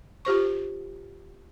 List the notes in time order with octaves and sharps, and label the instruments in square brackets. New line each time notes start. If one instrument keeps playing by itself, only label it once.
[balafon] F4 G4 C5 C#6